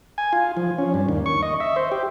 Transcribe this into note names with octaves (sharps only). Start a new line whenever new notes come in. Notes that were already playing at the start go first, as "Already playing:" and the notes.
G#5
F4
F3
C#4
G2
D#2
C#6
D#5
E5
C5
G4